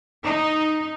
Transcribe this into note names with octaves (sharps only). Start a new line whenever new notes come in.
D#4